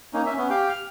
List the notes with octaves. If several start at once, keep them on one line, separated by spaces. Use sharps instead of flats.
A#3 C#4 D#4
C#4 E5
B3 C#4
G4 F5 G5
F6